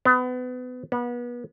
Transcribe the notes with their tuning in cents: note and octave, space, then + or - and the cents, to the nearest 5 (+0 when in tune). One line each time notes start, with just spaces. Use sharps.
B3 +30
B3 -30